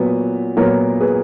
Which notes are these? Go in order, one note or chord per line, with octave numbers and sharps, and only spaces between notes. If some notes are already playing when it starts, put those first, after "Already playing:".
Already playing: A#2 F#3 B3 B4
A#2 F#3 B3 A#4 C#5
G#4 B4